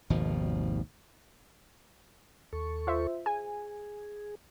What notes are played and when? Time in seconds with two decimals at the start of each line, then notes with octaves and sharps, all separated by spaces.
0.10 G#1 D#2 B2 F3
2.53 D#2 A4 C#6
2.87 F4 C5 E5
3.26 G#4 G#5